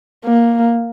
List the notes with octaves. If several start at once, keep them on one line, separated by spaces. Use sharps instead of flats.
A#3